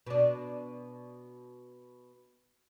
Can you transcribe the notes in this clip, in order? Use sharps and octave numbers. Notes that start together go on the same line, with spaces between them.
B2 D4